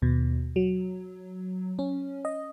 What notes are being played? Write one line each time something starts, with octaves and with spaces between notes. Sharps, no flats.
D#2 B2
F#3
C#4
D#5